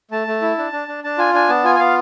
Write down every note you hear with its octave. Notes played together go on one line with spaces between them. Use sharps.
A3 A5
A3
E4
D4
D4
D4
D4 A5
F4 G#5
D4 G#5
B3 A5
F4 G#5
G#5
B3 F5